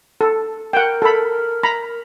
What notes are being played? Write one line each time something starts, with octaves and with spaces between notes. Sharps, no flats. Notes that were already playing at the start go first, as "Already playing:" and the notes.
A4
A#4 F#5 G5
A4 B5
A#5 B5